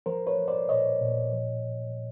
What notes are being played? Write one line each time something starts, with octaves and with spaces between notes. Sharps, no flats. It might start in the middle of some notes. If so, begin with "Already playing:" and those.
F3 A#4 C5
B4 C#5
F3
C5 D5
A#2 C#5 D#5
A#2
F3